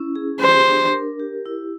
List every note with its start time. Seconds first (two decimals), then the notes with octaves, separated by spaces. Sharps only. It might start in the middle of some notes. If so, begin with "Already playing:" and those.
Already playing: C#4 E4
0.16 G#4
0.41 G4 C5
0.67 D4
0.93 A#4
1.20 G4
1.46 E4